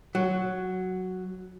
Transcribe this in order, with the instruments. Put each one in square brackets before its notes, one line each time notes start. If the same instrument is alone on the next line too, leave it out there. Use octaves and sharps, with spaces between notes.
[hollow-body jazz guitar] F#3